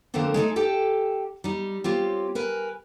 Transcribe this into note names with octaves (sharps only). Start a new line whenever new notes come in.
D3 F3 A3 A#3 C4 D4
G#3 A3 D#4 A4
G4 A4 G5 A5
G3 D#4
C4 F4 G4 C#5
A#4 B4 G#5